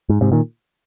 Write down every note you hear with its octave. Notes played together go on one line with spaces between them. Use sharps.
G#2
G#2 C3
A#2 D#3